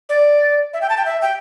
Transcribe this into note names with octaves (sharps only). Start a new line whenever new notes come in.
D5
E5
G5
A5
G5
E5
G5